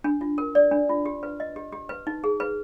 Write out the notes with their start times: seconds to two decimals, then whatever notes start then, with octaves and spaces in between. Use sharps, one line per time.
0.04 D4
0.21 F4
0.38 A#4
0.55 D5
0.71 D4
0.89 F4
1.06 G4
1.23 B4
1.40 D#5
1.56 G4
1.72 G4
1.89 B4
2.07 D#4
2.24 G#4
2.40 B4